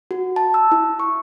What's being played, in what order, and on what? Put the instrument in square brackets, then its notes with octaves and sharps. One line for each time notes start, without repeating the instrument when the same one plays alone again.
[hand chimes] F#4
A5
E6
E4
C#6